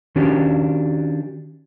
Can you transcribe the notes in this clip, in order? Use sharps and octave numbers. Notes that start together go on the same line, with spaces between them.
D#3 C#4 D4 F#4 G4